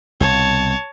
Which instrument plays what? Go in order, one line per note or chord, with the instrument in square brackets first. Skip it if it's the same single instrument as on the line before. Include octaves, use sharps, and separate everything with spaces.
[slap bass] C2 B2 [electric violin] C#5 A5